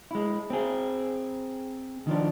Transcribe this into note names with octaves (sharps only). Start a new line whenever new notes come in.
G#3 E4
C4 G#4
D#3 F3 D4